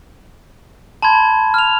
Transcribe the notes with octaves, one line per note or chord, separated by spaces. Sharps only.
A5 B5 C6 G#6
F6 F7